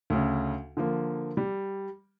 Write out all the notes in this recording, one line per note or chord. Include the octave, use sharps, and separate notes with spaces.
D2 C#3
D3 F3 A#3
G3